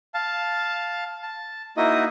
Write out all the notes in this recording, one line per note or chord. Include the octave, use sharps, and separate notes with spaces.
F5 A5
A5
A#3 D#4 E4 F#4 D#5 D#6